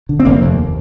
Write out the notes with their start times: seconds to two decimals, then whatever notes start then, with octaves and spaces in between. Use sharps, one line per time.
0.09 D3
0.20 C4
0.25 F1 A#3
0.42 D#2